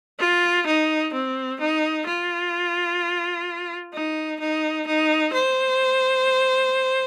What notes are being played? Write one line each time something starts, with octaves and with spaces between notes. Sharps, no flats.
F4
D#4
C4
D#4
F4
D#4
D#4
D#4
C5